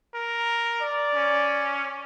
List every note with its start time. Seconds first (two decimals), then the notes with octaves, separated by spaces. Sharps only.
0.14 A#4
0.82 D5
1.15 C#4